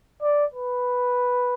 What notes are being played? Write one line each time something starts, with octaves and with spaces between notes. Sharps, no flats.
D5
B4